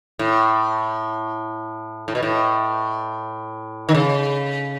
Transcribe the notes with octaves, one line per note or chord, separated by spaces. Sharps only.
A2
A2
B2
A2
D#3
C#3